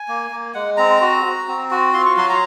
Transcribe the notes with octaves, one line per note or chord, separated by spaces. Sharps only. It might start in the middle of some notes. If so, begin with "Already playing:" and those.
Already playing: G#5
A#3
A#3
G#3 F#5
C4 A#5
F#4
F#4
C4
F#4
F4 C6
C#6
F#3 C6
A#5